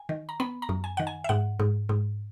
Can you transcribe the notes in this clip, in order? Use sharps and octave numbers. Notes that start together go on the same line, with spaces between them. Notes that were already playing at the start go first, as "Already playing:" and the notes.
Already playing: G#5
D#3
A#5
B3 B5
A#5
F#2
G#5
D#3 F#5
G#5
E5
G#2 F#5
G#2
G#2